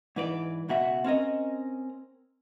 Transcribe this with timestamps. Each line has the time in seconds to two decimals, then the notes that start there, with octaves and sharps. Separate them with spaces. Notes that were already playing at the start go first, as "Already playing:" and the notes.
0.16 G#2 E3 B4 D5
0.69 C#2 B2 F#4 E5
1.04 C4 C#4 A#4 D#5